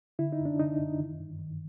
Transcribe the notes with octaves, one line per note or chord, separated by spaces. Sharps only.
D3 E4
D#4
F#2
D4
D3 D#4
F#2
D#3
G2
D#3